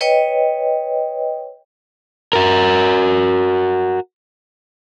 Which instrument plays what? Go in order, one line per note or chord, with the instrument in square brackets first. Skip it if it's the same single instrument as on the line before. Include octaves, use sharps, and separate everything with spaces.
[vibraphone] B4 C#5 D#5 G5
[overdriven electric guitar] F#4 A#4